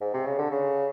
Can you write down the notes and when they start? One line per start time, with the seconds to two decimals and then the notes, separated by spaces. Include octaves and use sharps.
0.01 G#2
0.14 C3
0.26 C#3
0.39 D3
0.51 C#3